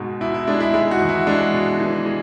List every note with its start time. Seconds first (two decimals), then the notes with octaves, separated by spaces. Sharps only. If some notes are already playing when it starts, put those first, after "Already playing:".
Already playing: G#2 B2 G#3
0.21 B2 E4
0.34 E4
0.47 G#3 D4
0.60 E4
0.74 G#3 E4
0.91 F#4
1.00 E2
1.09 E4
1.27 G#3 D4
1.53 B2
1.80 E3
2.06 G#3